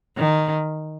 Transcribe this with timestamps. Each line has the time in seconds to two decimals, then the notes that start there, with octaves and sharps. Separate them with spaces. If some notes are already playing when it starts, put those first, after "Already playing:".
0.18 D#3